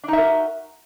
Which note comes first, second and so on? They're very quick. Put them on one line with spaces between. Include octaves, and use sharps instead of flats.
D4 D#4 E5 A#4 F#4